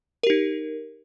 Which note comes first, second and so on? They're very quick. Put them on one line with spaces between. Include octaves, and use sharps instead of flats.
A#4 G4 D#4